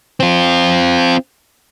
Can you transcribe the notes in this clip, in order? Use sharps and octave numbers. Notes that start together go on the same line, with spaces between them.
C4 F4